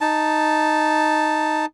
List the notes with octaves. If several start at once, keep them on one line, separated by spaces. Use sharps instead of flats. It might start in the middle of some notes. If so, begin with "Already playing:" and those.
D#4 A5